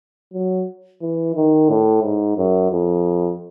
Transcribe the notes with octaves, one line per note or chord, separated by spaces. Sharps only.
F#3
E3
D#3
A2
G#2
F#2
F2